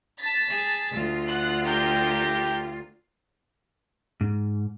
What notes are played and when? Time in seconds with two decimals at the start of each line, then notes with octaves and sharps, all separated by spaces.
0.19 A5 A6 B6
0.48 G#4
0.92 D2 F4
1.29 F#5 F#6
1.65 G4 A#4 G6
4.21 G#2